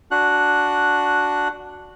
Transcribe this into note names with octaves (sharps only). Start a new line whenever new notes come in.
D4 F#4 F#6